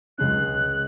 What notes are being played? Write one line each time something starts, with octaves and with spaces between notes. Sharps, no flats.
C#2 C#3 G#3 C#4 F#6